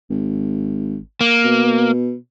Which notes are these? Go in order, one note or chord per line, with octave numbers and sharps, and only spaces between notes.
G#1
A#3
B2